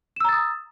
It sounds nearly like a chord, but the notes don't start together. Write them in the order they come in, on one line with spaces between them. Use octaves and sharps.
E7 E6 A#5 A6 D#6